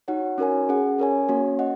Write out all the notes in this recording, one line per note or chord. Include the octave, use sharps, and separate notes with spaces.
D#4 F#4 C#5 F#5
C#4 F#4 A#4 C#5 G#5
C#4 G#4 F#5
C#4 A#4 C#5 G#5
A#3 C#4 F#4 C#5
D#5 F#5